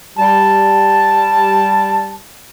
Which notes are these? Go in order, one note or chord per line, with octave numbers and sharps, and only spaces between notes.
G3 A5